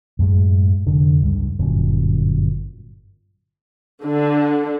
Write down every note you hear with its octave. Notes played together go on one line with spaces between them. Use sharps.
F#2 A2 G#3
F1 D3
C#2 G2
G1 F#2 A#2
D3